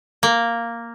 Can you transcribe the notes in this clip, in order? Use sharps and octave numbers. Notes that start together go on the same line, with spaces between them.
A#3